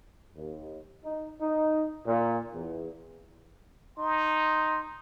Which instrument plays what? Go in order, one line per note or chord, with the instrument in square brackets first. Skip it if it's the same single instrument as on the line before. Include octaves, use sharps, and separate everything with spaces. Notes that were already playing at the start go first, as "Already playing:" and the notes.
[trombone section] D#2
D#4
D#4
A#2
E2
[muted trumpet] D#4 [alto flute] C6